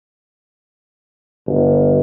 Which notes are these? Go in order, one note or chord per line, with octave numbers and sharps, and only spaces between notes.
G1